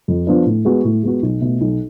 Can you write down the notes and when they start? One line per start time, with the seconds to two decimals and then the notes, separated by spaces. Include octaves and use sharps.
0.08 F2
0.27 F3 B3 D4
0.46 A2
0.65 G#3 B3 F#4
0.84 A2
1.03 G#3 B3 F#4
1.22 B1
1.41 B2 A3
1.61 B1